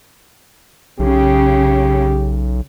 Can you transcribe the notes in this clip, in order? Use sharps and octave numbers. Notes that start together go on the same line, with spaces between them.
B1 C#3 G4